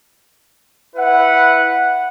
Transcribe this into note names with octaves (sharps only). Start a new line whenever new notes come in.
E4 B4 F#5